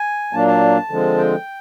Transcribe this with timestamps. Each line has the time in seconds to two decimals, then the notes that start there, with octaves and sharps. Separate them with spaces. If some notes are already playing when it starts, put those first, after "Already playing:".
Already playing: G#5
0.32 A#2 F#3 A#3 D4 A5
0.47 A5
0.90 D3 F3 G#3 C4
1.18 G5